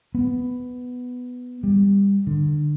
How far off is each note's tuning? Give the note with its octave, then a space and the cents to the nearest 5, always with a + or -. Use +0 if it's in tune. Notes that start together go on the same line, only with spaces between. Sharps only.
B3 +5
G3 +25
D3 +25